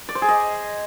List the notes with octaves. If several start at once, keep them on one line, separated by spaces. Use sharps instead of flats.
D5
C5
G#4
D#5